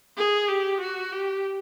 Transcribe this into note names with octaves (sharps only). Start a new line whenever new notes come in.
G#4
G4
F#4
G4